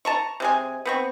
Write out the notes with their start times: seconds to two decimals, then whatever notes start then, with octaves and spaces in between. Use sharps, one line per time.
0.05 A5 A#5 C#6
0.40 C3 G#3 G#5
0.86 B3 C4 C#6